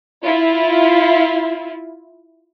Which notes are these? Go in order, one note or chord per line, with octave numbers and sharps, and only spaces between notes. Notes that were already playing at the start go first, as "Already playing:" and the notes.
E4 F4